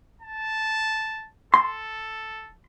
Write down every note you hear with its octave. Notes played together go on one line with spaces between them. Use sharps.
A5
A4 C6